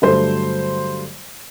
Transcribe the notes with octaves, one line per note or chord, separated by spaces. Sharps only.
G2 D3 F#3 A3 C5